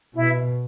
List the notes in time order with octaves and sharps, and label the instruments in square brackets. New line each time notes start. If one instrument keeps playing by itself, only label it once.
[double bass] B2 [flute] E4